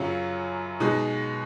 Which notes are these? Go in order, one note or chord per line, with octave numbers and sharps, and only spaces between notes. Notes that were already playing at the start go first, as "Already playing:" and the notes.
Already playing: F#2 C#3 F#3 C#4 F4
B2 G#3 D#4 F#4